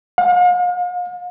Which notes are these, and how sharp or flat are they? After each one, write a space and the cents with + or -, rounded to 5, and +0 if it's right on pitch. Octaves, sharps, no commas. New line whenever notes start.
F5 +45